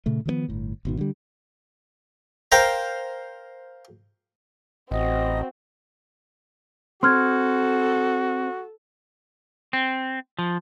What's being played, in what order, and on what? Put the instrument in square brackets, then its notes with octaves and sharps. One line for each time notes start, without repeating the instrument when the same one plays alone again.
[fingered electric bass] A#2 C#3 A3
D#3 F3 A3 B3
G1 A2
G#1 B2 D#3
D3 G3
[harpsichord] A#4 C5 F5 G5 A#5
[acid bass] A1 [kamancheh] C4 F#4 [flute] D#5
[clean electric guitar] C4 [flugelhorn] F#4 [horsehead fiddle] A4 [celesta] C6 F6 G#6
[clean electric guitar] C4
F3